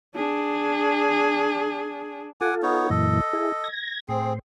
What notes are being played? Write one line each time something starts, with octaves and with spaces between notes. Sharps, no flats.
D4 G#4
F4 A4 F#5 G#5 D6
B3 D#4 C#5
F#2 A#2 E3 A4 D#5
E4 G#4
G#6 A#6
A2 C4 G#4 C5